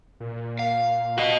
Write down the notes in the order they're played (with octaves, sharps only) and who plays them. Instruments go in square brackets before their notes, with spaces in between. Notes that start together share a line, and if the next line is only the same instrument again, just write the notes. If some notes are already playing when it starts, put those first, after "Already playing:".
[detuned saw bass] A#2
[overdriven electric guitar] F5
[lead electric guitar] F#4 D#5